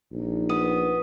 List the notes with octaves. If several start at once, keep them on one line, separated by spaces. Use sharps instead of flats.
A#1 D#4
B3 D#6 D#7